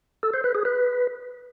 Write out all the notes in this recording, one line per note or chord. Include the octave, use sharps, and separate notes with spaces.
A4
C5
B4
G#4
B4